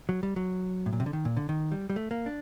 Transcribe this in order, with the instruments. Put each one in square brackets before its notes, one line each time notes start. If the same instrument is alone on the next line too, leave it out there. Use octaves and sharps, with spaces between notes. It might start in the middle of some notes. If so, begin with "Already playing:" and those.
[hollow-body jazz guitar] F#3
G3
F#3
A2
A#2
C3
D3
D#3
A#2
D3
D#3
G3
G3
A3
A#3
D4